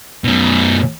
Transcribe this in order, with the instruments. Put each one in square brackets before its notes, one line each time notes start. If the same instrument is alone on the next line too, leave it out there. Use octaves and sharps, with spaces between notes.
[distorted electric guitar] F#2 B2